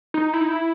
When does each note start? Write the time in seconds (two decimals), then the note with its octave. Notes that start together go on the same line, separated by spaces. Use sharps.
0.14 D#4
0.34 E4
0.41 D#4
0.48 E4